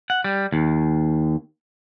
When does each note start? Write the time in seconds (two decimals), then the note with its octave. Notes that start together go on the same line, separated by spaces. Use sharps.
0.10 F#5
0.24 G3
0.52 D#2